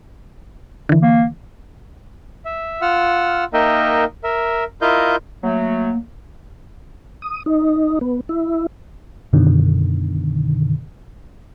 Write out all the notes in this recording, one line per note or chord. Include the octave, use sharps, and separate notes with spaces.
D3 E3
A#3
E5
F4 F#5 E6 F6
A#3 D#4 A#4 D#5 E5 G5
A#4 E5
E4 F4 A#4 D#5 F5 G6
F#3 A3 A#3
D#6
D#4
B3
E4
F#2 B2 D3 D#3